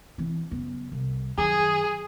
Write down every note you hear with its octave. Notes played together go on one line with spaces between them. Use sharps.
E3 C4
F#1 B3
C2
F#2 D#3 G#4